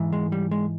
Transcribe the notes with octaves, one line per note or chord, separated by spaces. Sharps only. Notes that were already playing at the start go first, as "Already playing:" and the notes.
Already playing: G#2 E3
G#3
G3
G#3